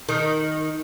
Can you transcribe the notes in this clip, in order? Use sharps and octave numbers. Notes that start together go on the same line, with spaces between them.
D#3